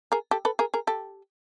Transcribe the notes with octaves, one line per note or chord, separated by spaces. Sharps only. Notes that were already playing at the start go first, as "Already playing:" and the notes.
G#4 A#4
G4 A4
A4 B4
G#4 A#4
G#4 A#4
G4 A4